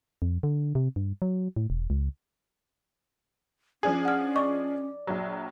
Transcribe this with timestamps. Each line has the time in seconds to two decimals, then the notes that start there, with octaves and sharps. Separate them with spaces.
0.22 F2
0.43 D3
0.75 C3
0.96 G2
1.22 F#3
1.56 A2
1.70 E1
1.90 C#2
3.83 F3 C#4 D4 G#4 G#5
4.05 F#5 F6
4.36 D5 D#5 C#6
5.07 A#1 F#3